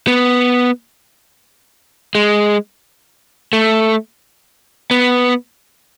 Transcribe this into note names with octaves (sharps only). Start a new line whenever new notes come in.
B3
G#3
A3
B3